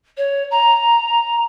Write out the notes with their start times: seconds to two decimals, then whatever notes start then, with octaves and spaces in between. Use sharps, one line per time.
0.17 C#5
0.51 A#5